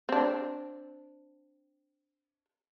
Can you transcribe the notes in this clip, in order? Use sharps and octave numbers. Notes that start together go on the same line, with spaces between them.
C4 D4